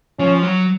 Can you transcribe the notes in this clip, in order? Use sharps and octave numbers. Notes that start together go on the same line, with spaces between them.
F3 C#4
F#3